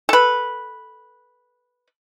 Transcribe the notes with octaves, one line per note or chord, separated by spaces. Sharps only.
A4 B4